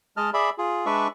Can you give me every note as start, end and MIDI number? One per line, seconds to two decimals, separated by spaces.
0.17 0.30 56
0.17 0.30 75
0.17 0.30 81
0.17 0.30 89
0.34 0.50 68
0.34 0.50 74
0.34 0.50 76
0.34 0.50 83
0.58 0.86 65
0.58 0.86 68
0.86 1.08 56
0.86 1.08 62
0.86 1.08 71
0.86 1.08 74
0.86 1.08 76
0.86 1.08 85